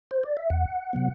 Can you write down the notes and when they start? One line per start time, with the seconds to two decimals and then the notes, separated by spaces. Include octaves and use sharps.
0.11 C5
0.23 D5
0.37 E5
0.50 E2 F#5
0.93 C3 F#3 B3